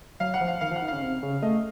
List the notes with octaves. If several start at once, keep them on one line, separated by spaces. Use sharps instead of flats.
F#3 F5
F#5
F3
F5
D#3 F5
F3
F#5
D#3
C#3 F5
C3
C#3
A3 D#5